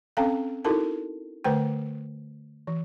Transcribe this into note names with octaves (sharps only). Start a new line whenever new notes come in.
C4 C#4 A4 F5 G5 A#5
D#4 E4 F#4 A4 A#4 A5
D3 A3 B4 C5 G5
E3